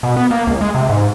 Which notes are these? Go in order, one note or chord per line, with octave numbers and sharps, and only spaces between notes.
B2
B3
A#3
C#2
G#3
C3
G#2